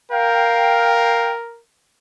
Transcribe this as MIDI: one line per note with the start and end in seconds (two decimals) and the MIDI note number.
0.12 1.62 70
0.12 1.33 77
0.12 1.33 79